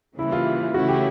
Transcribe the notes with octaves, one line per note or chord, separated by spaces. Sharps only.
C#3 E3 G3 A#3 E4
F4
C#3 E3 A3 C#4 E4 F#4
G4